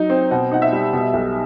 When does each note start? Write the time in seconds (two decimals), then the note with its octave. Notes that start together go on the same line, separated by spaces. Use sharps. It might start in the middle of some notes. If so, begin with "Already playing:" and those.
Already playing: F#3 D#4
0.10 C4
0.31 B2 F#5
0.51 D#4 F#5
0.62 E5
0.73 G3
0.93 B2
1.13 B1